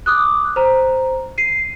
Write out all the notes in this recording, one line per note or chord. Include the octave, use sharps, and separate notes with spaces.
D6 D#6 F#6
C5 A#5
C7 D#7